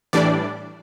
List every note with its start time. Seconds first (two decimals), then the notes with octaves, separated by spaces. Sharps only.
0.13 A2 E3 G3 D4 D5